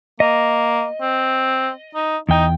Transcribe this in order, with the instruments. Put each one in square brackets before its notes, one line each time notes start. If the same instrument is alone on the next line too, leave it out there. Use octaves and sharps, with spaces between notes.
[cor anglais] A#3 [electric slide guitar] D#5
[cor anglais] C4
D#4
[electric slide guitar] E2 G5 [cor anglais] D#4